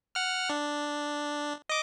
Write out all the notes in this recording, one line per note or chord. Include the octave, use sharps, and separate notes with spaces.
F#5 F6
D4
D#5 D6